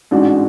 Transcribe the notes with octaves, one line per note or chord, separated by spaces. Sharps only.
A1 G#2 G#3 D4 F#4